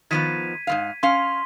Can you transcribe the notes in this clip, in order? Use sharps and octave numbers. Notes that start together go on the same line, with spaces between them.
D#3 F3 B3 G#6 B6 D#7
G#2 F3 F5
C#4 F5 C6 B6